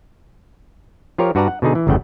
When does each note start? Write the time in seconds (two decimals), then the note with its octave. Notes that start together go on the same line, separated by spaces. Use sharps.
1.18 F3 F4 G4 A#4 C#5
1.35 G2 F#4 B4 D5 A5 A#5
1.48 F#5
1.62 B2 D3 D#4 G#4
1.75 E3
1.87 G1 E2 C#3 A3 F#5 G5